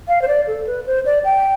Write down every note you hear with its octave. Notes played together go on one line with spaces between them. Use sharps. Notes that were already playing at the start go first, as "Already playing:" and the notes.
F5
C5
D5
A4
B4
C5
D5
G5